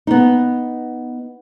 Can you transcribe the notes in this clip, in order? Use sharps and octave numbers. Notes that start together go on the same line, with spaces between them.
B3 D#4